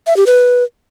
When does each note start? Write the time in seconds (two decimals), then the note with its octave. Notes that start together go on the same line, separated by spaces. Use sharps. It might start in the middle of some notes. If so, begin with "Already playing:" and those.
0.07 E5
0.17 G4
0.26 B4